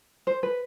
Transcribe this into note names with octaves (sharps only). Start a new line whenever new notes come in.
C5
B4